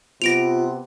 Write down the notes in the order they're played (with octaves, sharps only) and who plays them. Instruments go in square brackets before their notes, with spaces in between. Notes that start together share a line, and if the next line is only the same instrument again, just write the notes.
[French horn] C3 [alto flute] B3 [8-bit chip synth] F4 [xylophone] A#6 D7 F7